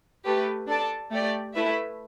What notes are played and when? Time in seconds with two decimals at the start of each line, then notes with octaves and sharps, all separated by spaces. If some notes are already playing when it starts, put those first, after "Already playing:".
0.25 A3 G4 B4
0.68 D4 A4 D5 A5
1.10 A3 G4 D5
1.54 A3 E4 B4 E5